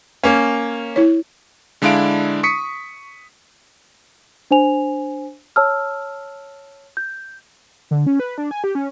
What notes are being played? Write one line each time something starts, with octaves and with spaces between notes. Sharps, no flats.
A#3 C#4
E4 C#5
D3 G#3 D4 E4 F5 D7
C#6 D#6 B6 C#7
D4 C5 G#5 F7
C#5 A5 E6 F6
G6
D3
C#4
B4
D4
G#5
G4
C#4